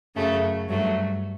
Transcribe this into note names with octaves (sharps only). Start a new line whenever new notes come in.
F#2 C#3 F#3 A3
G2 F#3 A3